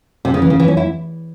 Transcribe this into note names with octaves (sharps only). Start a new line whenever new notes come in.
C3
C#3
E3
C#3
E3
C#4
E4